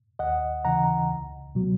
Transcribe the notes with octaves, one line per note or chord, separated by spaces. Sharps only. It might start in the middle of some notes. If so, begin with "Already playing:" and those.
D#2 D#5 F#5
C#3 E3 F#5 A#5
C#2
B2 F#3